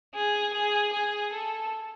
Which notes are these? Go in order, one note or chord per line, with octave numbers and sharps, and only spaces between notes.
G#4
G#4
G#4
A4